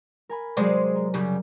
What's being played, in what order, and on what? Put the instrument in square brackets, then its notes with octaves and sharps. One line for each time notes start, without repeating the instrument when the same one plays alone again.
[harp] A#4 G#5 B5
[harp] C3 F#3 [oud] G#3 C5 D5
[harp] A#4
[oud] F#2 C#3 G3